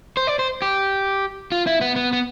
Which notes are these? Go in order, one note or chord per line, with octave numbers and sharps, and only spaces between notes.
C5
D5
C5
G4
F4
E4
B3
B3
B3